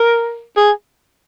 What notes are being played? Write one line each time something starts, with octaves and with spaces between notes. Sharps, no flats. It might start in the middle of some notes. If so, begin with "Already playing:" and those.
Already playing: A#4
G#4